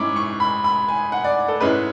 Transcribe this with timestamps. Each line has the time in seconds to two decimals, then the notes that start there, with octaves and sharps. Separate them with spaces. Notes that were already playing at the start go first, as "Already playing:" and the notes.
Already playing: G#2 G#3 C#4 E4 D6
0.16 C#6
0.40 B5
0.64 B5
0.89 G#5
1.12 F#5
1.24 D5
1.48 A4
1.60 G#2 G#3 C#4 E4 B4